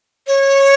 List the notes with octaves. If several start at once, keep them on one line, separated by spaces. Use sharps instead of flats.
C#5